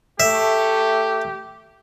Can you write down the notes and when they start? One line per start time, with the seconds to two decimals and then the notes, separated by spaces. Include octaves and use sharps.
0.20 A3 G4 E5